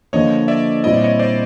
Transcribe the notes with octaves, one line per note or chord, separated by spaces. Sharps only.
D3 F3 A#3 C#5 D#5
D5 E5
A#2 G3 C4 E4 D#5
D5
C#5 D#5
C5 D5